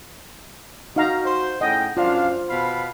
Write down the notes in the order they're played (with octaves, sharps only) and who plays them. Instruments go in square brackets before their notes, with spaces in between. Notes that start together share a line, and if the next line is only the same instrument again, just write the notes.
[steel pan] D#4 F5 A#5 [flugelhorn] F#4
[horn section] C5
[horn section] A2 C#4 G5 [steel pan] D#5 [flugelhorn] F#5
[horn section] F#2 D4 F5 [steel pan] F4 [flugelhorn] C5
[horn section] B2 F5 B5